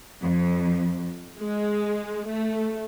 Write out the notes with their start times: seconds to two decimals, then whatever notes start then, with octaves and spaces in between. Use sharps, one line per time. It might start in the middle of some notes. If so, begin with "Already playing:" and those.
0.21 F2
1.39 G#3
2.27 A3